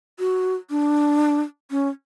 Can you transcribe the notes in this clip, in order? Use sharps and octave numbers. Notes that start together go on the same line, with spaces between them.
F#4
D4
C#4